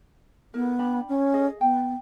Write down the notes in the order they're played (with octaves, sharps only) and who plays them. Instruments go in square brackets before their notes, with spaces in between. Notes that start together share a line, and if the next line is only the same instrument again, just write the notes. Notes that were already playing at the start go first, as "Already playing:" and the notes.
[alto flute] B3 [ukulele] E4 A#4
[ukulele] D4 G5 B5
[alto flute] C#4
[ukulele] G#4 D#5
[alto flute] B3 [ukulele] G5